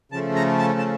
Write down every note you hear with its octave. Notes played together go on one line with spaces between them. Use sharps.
C#3 F3 A3 A5
A#5
A5
A5